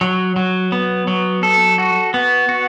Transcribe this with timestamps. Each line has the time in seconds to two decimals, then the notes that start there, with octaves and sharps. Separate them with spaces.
0.01 F#3
0.36 F#3
0.72 B3
1.07 F#3
1.43 A4
1.78 F#4
2.14 B3
2.49 F#4